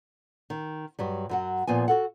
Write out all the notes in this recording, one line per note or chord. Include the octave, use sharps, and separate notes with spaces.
D#3
G2 F#3 G3
F#2 F#3 F#5
A#2 F3 B3 G#5
F#4 A4 F#5